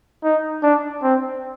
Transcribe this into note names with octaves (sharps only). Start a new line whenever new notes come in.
D#4
D4
C4